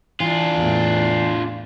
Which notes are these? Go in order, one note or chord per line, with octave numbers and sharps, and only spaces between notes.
E3 D4 F4
E2 A2